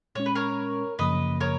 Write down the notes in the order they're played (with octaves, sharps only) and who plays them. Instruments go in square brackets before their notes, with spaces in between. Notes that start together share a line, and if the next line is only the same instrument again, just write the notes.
[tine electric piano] A#2 G#3 C#4 [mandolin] C#5
[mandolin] B4
A#4 C#5
[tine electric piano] F#2 C#3 F3 A#3 [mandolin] B4 D#5
[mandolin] A#4 C#5